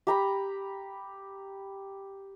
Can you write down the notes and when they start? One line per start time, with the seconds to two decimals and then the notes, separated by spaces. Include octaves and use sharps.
0.07 G4 A#5 B5